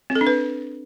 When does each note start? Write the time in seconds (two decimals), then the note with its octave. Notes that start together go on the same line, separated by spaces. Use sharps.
0.10 C4
0.15 A4
0.21 D4
0.27 B4